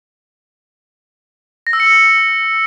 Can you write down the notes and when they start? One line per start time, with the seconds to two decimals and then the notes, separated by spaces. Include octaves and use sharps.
1.67 A#6
1.73 E6
1.80 C#7
1.86 E6